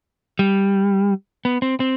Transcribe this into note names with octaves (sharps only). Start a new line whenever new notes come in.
G3
B3
C4
C4